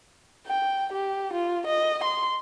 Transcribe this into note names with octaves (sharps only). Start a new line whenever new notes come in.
G5
G4
F4
D#5
C6